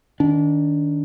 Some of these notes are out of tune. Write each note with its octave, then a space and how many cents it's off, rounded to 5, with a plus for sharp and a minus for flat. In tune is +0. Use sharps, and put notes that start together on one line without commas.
D#3 -10 D4 -30